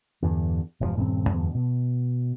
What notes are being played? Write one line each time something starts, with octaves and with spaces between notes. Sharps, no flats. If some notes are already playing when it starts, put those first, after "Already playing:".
E2 G2 D3
E1 G2 B2 F3
D#1 G2 A#3 C4
E2 G2 D3 B3
B2